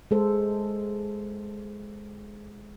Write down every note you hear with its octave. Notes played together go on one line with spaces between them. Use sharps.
G#3 A4 C5